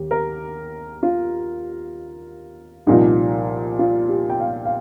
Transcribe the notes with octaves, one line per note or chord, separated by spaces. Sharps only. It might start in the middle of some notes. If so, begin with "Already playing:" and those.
Already playing: D#2 G4
A#4
F4
C2 A#2 F3 D#4
F4
G4
G5
F5
F5